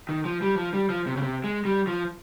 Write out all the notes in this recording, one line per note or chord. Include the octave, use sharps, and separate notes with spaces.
D#3
F3
G3
F3
G3
F3
C3
C#3
C3
G#3
G3
F3